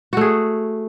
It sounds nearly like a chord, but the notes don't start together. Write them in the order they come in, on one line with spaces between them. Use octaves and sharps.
F#4 A3 G#4